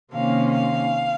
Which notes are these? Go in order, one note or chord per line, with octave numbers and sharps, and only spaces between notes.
C3 D#3 A#3 C#4 F5
F5